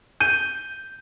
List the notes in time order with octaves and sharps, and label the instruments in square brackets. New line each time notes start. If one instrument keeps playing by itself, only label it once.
[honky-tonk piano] G6 D#7